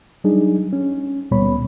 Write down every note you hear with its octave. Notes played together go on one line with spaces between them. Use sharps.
F#3 G3 D4 D#4 G#4
C#4
D2 A#2 G3 B3 C#5 B5